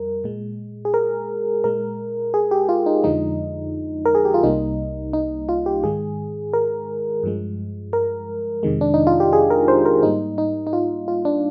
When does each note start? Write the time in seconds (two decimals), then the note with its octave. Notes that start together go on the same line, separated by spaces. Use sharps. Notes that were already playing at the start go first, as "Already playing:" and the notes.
Already playing: F2 G3 A#4
0.24 A#2 G#3
0.85 G#4
0.94 A#4
1.64 A#2 G#3 A#4
2.34 G#4
2.51 G4
2.69 F4
2.86 D#4
3.03 F2 D3 F3 G#3 D#4
4.05 A#4
4.15 G#4
4.25 G4
4.34 F4
4.43 C2 C3 G3 A#3 D#4
5.13 D#4
5.49 F4
5.66 G4
5.83 G#2 D#3 G#3 G#4
6.53 A#4
7.23 G2 F3 G#3
7.93 A#4
8.63 F2 C3 D#3 G#3
8.81 D4
8.94 D#4
9.07 F4
9.20 G4
9.33 G#4
9.50 A#4
9.68 C5
9.85 A#4
10.03 G#2 G3 A#3 D#4
10.38 D#4
10.67 D#4
10.73 F4
11.08 F4
11.25 D4